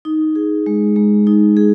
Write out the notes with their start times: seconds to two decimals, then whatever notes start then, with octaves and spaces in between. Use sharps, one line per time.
0.05 D#4
0.35 G#4
0.66 G#3
0.96 G#3
1.27 D#4
1.57 G#4